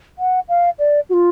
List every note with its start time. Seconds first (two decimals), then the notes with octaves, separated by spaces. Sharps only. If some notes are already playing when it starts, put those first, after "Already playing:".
0.19 F#5
0.49 F5
0.79 D5
1.09 F#4
1.13 F4